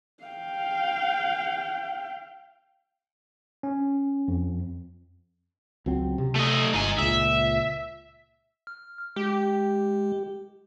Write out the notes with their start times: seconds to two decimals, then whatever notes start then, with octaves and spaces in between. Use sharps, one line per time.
0.24 F5 G5
3.63 C#4
4.28 F2
5.86 C#2 F#3 C4
6.18 C3
6.35 A3 D#5
6.74 G1 D#4 G#5
6.98 C#2 A#2 E5
8.67 F6
9.16 G#3 G4